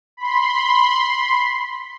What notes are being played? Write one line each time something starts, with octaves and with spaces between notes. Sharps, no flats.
B5 C6